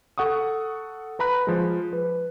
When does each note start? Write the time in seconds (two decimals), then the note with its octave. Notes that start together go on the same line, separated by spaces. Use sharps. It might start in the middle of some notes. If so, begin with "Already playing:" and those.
0.18 A4 F#5 C#6 D#6
1.19 B4 A#5 B5 F#6
1.47 F3 G#3
1.93 B4